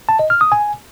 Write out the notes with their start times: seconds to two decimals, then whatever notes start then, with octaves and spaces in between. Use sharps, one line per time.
0.09 A5
0.19 D#5
0.30 F6
0.41 D#6
0.52 G#5